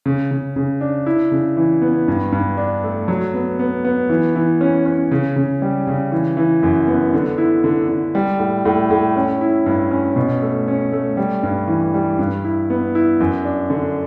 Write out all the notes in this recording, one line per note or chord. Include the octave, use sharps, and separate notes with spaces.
C#3
C#3
C#3
D4
E4
C#3
E3
B3
G2
G2
D4
A3
F#3
B3
B3
B3
E3
E3
C#4
C#4
C#3
C#3
G3
C#3
E3
E3
F#2
B3
D3
E4
D3
D3
G3
A2
A2
A2
C#4
E4
G2
C#4
B2
A3
C#4
A3
G3
G2
E3
G3
G2
E4
B3
E4
F#2
D4
D3